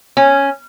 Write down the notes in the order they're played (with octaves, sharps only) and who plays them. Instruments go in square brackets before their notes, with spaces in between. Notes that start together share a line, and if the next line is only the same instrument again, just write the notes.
[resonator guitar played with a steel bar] C#4